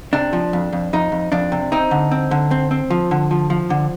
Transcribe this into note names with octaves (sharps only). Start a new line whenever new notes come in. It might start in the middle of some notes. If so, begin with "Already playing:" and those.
C3 D4
F3
F2
F2
F2 D#4
F2
F2 D4
C3
C4 D#4
D3
C4
D3
C4
C4
F3
D3
F3
F3
D3